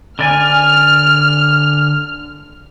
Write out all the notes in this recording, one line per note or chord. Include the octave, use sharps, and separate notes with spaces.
D3 D5 G#5 F6